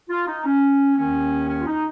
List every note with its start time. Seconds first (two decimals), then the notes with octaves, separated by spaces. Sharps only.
0.10 F4
0.27 D#4
0.45 C#4
0.97 D#2 D#3 A#3 C#4
1.49 C#4
1.62 F4
1.67 D#4